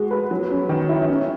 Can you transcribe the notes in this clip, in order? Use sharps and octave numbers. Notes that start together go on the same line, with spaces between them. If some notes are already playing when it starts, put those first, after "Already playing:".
Already playing: G#3 F#4
B4
F#3
C#4
D#3
E4
C#4